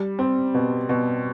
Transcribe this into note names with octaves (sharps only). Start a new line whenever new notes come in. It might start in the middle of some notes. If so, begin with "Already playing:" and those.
Already playing: G3
C4
B2
B2